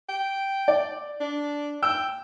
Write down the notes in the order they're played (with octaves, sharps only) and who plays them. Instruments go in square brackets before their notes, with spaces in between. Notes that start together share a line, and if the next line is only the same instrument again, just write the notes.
[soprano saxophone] G5
[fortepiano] D5
[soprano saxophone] D4
[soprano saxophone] G5 [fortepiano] E6